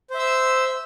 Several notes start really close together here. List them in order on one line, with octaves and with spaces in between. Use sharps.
C5 E5 E6